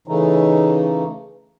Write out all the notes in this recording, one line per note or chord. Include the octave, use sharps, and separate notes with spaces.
C#3 E3 A3 D#4